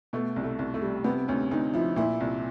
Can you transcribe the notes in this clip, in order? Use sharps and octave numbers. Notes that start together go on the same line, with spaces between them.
B2 A3
C2
A3
C2
A3
G3
C3 B3
D2 C#4
D2 D#4
F3 E4
A#2 E4
C2